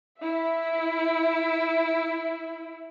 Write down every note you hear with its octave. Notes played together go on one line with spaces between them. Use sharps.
E4 E5